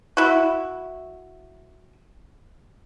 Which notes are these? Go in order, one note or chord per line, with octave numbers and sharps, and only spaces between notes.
E4 F#4